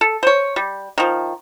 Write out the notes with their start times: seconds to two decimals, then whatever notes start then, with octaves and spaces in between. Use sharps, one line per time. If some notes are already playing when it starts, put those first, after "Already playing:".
0.01 A4
0.23 C5 C#5
0.56 G3
0.98 D#3 F3